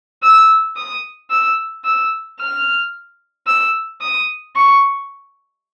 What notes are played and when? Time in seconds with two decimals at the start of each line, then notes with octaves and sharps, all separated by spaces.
0.23 E6
0.76 D#6
1.31 E6
1.84 E6
2.40 F6
3.47 E6
4.01 D#6
4.55 C#6